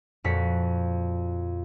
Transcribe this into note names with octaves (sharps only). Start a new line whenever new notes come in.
F2 A#2 F#4 B6 C#7